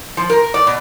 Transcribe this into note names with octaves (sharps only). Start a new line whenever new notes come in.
F3
A#4
D5
B2